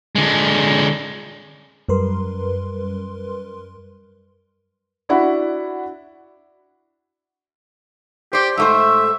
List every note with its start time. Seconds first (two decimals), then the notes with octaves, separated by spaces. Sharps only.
0.16 D3 G#3
1.89 F#2 G3 A#4 B4 C6
5.09 D4 E4 F#4 F#5 B5
8.33 G4 C5 D5
8.57 G#2 A3 C5 E5